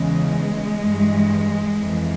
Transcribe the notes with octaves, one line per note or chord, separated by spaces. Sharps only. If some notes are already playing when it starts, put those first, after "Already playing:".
Already playing: E2 C#3 E3 G#3
G2 E3
F2 E3